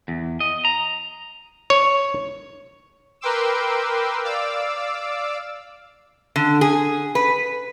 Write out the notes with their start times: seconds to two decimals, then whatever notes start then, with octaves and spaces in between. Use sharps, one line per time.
0.08 E2
0.40 D#5
0.65 A#5
1.70 C#5
3.21 A#4 B4 G5 C6 D6 E6
4.24 D5 F5 D6 E6
6.36 D3
6.61 G#4
7.15 B4